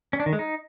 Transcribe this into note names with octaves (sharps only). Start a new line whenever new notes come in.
C#4
D4
D#3
G#3
D#4